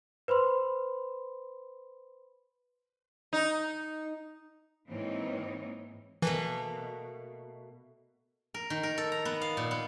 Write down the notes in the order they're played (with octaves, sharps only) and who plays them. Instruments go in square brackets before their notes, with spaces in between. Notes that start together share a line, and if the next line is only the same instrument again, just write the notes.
[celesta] B4 C5 B5 C6
[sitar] D#4
[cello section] G#2 E3 A#3 C4 D#4 C#5
[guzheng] B2 A3 A#3 [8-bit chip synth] E3
[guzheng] A#4
D#3
A#4
A4
A#5
B3
F5
A#2
B3